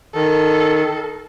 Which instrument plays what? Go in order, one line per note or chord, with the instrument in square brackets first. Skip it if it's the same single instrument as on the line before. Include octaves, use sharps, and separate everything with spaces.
[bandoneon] D#3 [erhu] A4